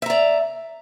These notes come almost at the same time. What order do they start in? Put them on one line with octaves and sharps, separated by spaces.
E5 A#5 D5